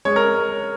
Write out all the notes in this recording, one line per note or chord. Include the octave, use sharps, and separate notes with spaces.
G#3 C#5
A#4